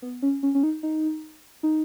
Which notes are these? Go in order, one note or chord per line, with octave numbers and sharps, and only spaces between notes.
B3
C#4
C#4
C#4
D#4
D#4
D#4